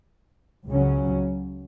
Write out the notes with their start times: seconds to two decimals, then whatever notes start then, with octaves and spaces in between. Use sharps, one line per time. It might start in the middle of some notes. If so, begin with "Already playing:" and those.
0.67 C#2 C#3 F#3 C#4